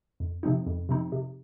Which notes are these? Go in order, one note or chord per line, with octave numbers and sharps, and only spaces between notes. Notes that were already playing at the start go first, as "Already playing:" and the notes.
F2
C3 F3 C4 D#4
F2
C3 F3 C4 D#4
C3